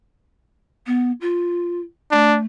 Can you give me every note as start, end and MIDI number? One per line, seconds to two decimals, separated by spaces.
0.86 1.12 59
1.21 1.80 65
2.12 2.45 57
2.12 2.38 62